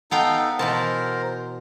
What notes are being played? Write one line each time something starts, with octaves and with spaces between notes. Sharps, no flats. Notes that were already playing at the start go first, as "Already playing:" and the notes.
B3 D#4 A4 F5 G5
B2 E3 A#4 C5 A5